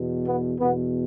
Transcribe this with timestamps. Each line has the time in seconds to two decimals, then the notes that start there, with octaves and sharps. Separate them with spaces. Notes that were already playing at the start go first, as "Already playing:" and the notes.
Already playing: E2 B2
0.26 B3
0.60 E2 B2 B3